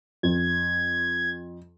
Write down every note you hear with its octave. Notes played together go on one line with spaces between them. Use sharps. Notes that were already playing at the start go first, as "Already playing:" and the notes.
F2 G#6